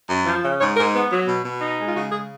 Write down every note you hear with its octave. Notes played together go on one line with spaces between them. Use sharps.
F#2
F3
C#3
G#2 C#5
G#2 A#4
B3
F#3
B2
B2
D#4
G#3
F4
C#3 F#4
C#3 G#4